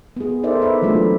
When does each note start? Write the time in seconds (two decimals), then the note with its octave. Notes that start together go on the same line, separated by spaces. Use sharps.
0.17 B3 G#4
0.43 D#4 A4 A#4 C5 D5 E5
0.59 B3 A4 B4 E5
0.82 E3 F#3 G#3 A3 D4 F4